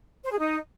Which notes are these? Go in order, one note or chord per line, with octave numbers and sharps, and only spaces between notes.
C5
G#4
D#4